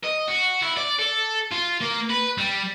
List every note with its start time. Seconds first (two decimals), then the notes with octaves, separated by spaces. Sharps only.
0.04 D#5
0.28 F#4
0.63 E4
0.77 D5
0.99 A4
1.52 F4
1.81 A#3
2.10 B4
2.38 G3